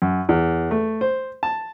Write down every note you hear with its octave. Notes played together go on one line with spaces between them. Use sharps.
F#2
E2
A3
C5
A5